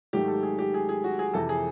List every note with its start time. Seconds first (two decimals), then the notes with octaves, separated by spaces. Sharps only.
0.13 G#2 D#3 F#3 A3 G4
0.28 A4
0.43 G#4
0.59 G4
0.74 G#4
0.89 G#4
1.04 F#4
1.19 G#4
1.34 F2 C3 E3 A4
1.49 G#4